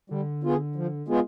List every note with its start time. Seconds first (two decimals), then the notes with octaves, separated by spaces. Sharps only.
0.10 D3 G3
0.44 B3 F4 G#4
0.76 F3
1.08 G#3 B3 F4 G#4